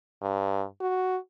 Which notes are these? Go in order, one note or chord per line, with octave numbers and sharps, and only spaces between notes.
G2
F#4